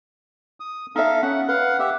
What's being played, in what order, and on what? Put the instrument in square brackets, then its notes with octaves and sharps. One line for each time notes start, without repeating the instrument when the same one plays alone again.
[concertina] D#6
[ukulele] D#4 E5 [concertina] A4 F5
[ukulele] C#4 [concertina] F#5
[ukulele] B4 [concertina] F5 F#5
[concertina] G4 E5 [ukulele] F5